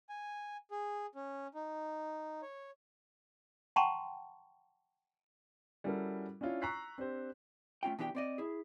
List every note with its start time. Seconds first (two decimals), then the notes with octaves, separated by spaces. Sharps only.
0.09 G#5
0.71 G#4
1.15 C#4
1.54 D#4
2.42 C#5
3.76 F#5 G5 A5 A#5 C6 C#6
5.84 G3 C#4 E4 F#4 A4 A#4
6.41 C#4 D4 E4 F4 C#5
6.62 A#5 C#6 E6 F#6 B6 C7
6.98 C4 D4 G4 C5
7.83 A3 C#4 F4 G5
7.99 B2 E3 D4 G4 G5
8.15 C4 D5 D#5
8.38 E4 G#4